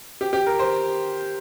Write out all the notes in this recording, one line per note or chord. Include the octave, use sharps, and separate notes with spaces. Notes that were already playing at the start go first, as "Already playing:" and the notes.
G4
G4
A#4
C5